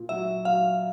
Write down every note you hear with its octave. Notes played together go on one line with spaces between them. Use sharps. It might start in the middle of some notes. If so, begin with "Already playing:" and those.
Already playing: A#2
F#3 E5
F#3 F5